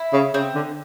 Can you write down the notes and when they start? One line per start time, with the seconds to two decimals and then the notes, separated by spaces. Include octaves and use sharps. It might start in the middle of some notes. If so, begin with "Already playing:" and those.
Already playing: E4
0.13 C#3
0.34 C#3 C4
0.55 D3